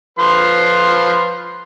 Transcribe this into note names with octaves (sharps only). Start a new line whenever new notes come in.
F3 B4 C6